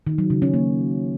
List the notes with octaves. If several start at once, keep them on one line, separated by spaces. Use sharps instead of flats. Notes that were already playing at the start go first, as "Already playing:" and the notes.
D#3
F#3
C#3
C#4
A#3